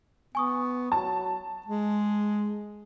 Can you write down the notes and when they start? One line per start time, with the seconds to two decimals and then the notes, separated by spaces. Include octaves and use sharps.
0.35 B3 G#5 C#6 D#6
0.92 F#3 A5
1.66 G#3